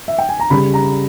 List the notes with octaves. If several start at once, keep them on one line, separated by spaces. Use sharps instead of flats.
E5
G5
G#5
A#5
C#3 G3 B5
A#5